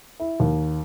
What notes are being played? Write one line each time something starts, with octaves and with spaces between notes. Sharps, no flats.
E4
D#2